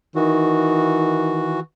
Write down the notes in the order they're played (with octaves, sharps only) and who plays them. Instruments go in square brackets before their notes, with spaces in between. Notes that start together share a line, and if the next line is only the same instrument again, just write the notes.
[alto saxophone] D#3 [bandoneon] E3 F#4